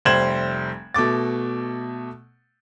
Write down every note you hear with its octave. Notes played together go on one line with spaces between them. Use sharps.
F1 G3 C5 G#6 E7 F#7
B2 A3 D6 A6